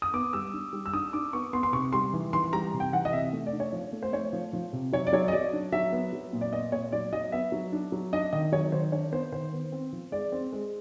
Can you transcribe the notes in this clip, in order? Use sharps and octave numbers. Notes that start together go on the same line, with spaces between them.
D#6
B3 D6
G3 E6
D4
G3
E6
D4 D#6
D4 D6
B3 C#6
B3 C6
C6
C3 C#6
G3 C6
E3
E3 C6
G3 A#5
C3
G5
E3 F#5
D#5
C3 E5
A3
D5
D4
C#5
F3
A3
C5
A3 C#5
F3
F3
C3
F#3 C#5
D5
F#3 C#5
D#5
F#3 D5
D4
F#3 E5
B3
F#3
A#2
D5
B3 D#5
A#2 C#5
F#3 D5
F#3 D#5
B3 E5
F#3
D4
F#3
D4 D#5
D#3 D#5
F#3 C#5
D#3 C5
D4 C#5
B3 C5
D#3 C5
B3
C4
F3
G#3 D5
C4
G#3